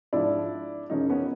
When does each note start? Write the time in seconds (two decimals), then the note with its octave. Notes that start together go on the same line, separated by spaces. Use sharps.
0.13 G#2 F3 D4 E4
0.90 F#2 C#3 F3 C#4 D#4
1.10 B3 C#4